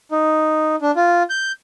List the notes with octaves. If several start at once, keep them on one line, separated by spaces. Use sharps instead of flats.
D#4
D4
F4
G6